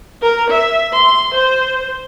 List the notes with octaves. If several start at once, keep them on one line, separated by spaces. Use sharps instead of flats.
A#4
E5
C6
C5